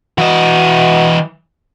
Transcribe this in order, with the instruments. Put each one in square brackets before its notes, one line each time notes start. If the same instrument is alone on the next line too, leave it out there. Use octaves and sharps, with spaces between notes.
[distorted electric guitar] E3 D#5 [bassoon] F#4